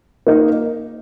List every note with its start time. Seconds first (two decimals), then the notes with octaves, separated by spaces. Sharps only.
0.27 A#3 D#4 A#4 D#5